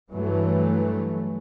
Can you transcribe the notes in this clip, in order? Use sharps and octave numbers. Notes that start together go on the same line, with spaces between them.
G2 E3 F#3 A3